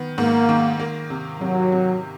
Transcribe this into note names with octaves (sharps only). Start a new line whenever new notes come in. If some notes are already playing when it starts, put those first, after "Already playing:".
Already playing: D#3 B3
G#2 A#3
D#3
A#3
C3
C3 F#3
C3